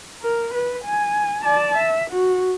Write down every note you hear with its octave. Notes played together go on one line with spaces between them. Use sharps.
A#4
B4
G#5
D5 A5
E5
F#4